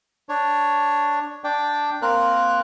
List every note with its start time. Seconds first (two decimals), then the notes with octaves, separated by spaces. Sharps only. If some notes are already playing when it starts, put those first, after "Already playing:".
0.29 D4 C#5
1.44 D4 D5 G5
2.02 A#3 C4 A#4 F#6